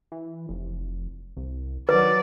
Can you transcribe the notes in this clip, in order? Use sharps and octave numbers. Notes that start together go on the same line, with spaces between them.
E3
F1
C2
D#3 F#3 B4 D5